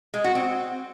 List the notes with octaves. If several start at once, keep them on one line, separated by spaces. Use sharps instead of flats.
G#3
F#4
C4